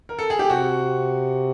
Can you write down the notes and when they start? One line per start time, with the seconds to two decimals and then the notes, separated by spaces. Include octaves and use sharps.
0.09 A#4
0.19 A4
0.30 G#4
0.39 G4
0.50 C3 F#4